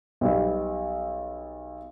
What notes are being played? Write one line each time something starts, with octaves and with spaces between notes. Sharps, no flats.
B1 G3